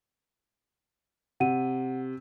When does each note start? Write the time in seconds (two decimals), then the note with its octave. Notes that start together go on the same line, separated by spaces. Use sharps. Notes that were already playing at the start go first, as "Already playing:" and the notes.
1.40 C3 F#5 D#7